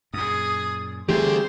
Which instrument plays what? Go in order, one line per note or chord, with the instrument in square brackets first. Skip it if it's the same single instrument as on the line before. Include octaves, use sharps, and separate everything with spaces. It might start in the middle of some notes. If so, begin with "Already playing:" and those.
[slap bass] F#2 A#2 [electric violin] G#4 D#6
[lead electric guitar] D3 A3 [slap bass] E3 G3 C4 [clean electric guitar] G4 G#4 [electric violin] C5